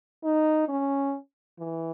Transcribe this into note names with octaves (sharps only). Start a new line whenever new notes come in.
D#4
C#4
E3